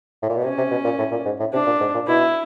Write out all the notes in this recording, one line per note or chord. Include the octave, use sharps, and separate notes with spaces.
A2
A#2
B2
C3 C#4
C3
B2
A#2
A2
A#2
G#2
A2
C3 D4
A#2
G#2
A#2
B2 E4